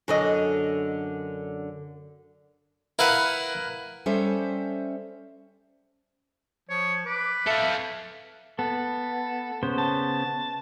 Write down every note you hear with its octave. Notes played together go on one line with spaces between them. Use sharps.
F#2 D3 D#5
E4 A#4 B4 F5 F#5
G3 C#4 A4 C5 E5
F3 C#5
B4 D6
A4 E5 F5
B3 A4
C#3 B3 C5
A5